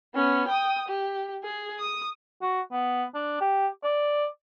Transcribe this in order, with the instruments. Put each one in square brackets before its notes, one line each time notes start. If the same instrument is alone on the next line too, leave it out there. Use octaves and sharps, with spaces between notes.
[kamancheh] B3 C#4
G5 D#6
G4
G#4
D#6
[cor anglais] F#4
B3
D4
G4
D5